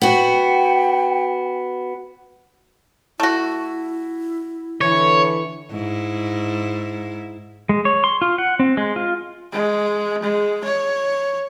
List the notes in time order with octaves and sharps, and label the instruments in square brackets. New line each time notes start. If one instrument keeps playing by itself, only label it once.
[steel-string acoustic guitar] B3 F#4 [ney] G5
[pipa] A3 F#4 [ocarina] E4
[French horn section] D3 E3 [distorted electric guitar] C#5
[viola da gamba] G#2 E4
[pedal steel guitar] G#3
C#5
C6
F4
F#5
C4
G#3
F4
[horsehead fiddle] G#3
G#3
C#5